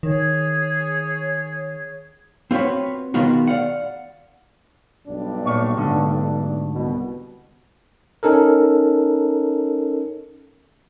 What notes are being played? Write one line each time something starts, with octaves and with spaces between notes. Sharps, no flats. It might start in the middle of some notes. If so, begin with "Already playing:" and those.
D#3 G#4 C#5
C4 F4 F#4 B4 C#5
B2 D#3 G#3 B3 F4 F#4
D5 F5 F#5
B1 G2 D4
A#2 C#5
G#2 D3 A3
C2 B2
C#4 D#4 A4 A#4